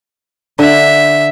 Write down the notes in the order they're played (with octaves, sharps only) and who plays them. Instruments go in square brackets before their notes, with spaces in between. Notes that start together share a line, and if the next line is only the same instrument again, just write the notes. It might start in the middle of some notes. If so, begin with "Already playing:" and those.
[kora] D3 [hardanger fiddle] E5